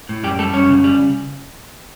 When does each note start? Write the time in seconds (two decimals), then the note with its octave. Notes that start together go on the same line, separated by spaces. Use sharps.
0.09 A2
0.23 F#2 G3 G4
0.39 G3 A3 A4
0.54 F#2 C#4 C#5
0.69 C#3
0.84 G3